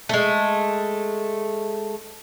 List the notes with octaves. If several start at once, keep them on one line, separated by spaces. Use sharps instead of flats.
G#3 A3